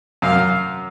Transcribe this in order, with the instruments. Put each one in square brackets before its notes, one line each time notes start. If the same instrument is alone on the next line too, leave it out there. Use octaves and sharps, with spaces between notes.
[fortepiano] F#2 [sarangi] F5